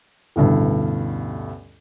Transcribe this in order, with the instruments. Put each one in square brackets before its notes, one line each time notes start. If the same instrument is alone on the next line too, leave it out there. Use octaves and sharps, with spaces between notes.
[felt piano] A1 D2 G2 B2